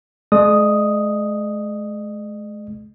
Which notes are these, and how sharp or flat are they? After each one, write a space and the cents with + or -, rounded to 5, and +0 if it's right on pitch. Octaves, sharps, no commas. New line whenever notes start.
G#3 +40 D#5 -45 D#6 +0